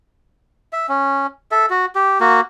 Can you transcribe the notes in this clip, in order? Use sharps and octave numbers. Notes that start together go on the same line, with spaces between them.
E5
C#4
A4 E5
F#4
G4
A#3 F#4